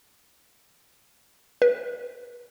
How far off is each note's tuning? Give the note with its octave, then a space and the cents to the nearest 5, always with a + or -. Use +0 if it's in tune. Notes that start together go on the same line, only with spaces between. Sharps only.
B4 -35